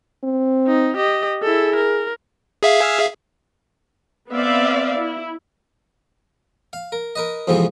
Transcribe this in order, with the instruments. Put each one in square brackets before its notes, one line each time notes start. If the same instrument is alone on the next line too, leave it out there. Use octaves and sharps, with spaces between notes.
[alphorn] C4
[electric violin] D#4
G4 D#5
[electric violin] E4 A4 [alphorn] G#4
[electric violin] A#4
[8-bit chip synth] G#4 E5 F5
[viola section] B3 C4 D5 E5 F5
E4
[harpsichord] F5
A#4
A#4 B4 D#5
F2 G#2 C3 E3 F3 B3